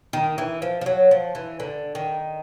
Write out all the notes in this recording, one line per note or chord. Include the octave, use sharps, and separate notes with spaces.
D#3
E3
F3
F3
F#3
F3
E3
D3
D#3